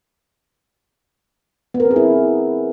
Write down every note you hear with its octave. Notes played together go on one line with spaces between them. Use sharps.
B3
A#4
C4
G#4
E4